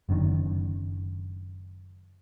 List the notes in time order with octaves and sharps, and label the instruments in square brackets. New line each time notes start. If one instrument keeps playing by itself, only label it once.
[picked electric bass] F#1 F#2 D3 D#3